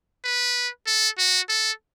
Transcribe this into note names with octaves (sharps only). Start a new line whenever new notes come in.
B4
A4
F#4
A4